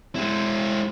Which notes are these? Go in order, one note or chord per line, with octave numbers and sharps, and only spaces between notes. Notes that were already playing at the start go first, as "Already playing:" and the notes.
G#3 E4